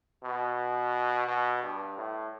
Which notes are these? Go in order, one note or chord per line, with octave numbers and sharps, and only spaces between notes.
B2
B2
G2
A2